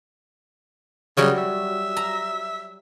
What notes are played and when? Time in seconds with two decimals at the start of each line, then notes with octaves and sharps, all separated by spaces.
1.17 C#3 F#3 G3 F#4
1.37 E5
1.97 A#5